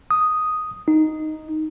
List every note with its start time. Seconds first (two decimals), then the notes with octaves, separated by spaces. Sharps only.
0.11 D#6
0.88 D#4